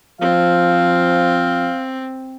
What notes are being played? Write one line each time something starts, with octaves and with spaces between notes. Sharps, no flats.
F3 C4 F5